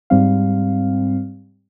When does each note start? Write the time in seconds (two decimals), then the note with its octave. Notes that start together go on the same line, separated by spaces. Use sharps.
0.10 G#2 G3 C4 F5